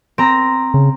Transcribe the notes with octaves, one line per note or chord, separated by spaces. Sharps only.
C4 A#5
C#3